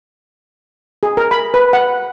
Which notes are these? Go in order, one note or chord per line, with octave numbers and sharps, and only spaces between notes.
G#4
A#4
B5
B4
F#5